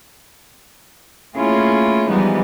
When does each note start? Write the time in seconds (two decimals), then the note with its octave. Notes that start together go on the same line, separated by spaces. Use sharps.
1.34 A3 A#3 C#4 E4 F4 G#4
2.08 E3 F3 G3 G#3 B3 D#4